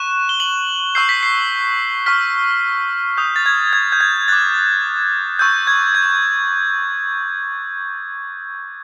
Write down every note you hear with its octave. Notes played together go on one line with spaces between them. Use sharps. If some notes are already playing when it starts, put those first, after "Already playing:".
Already playing: C#6 F#6 E7
G7
F#7
C#6 E6 G6 C7
B6
C7
C#6 F6 B6
D#6 G6
A6
G#6
G#6
G6
G#6
D6 F#6 A6
C#6 E6 G6
G#6
G#6